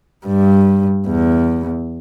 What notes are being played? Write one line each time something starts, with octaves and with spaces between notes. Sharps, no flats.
G2
E2